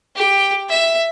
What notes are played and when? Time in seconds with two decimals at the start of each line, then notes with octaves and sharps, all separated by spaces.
0.16 G4
0.69 E5